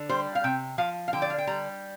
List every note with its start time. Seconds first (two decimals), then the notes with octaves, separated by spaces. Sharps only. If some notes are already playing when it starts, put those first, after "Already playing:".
Already playing: D3
0.09 G3 C5
0.35 F5
0.44 C3 G5
0.78 F3 F5
1.08 F5
1.13 D3 G5
1.22 D5
1.30 F5
1.38 G5
1.47 G3 A#5